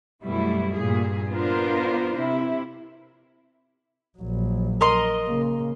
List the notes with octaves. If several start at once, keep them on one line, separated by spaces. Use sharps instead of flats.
F#2 B2 G3 A3 E4
G2 A#2 G#4
B3 D4 F4 A#4 C5
C3 E4
A#1 F#3
A#4 D#5 C6
C#3 A#3